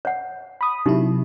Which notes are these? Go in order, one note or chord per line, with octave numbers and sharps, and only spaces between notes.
C#5 F#5
B5 D#6
C3 F#3 D#4 E4 G4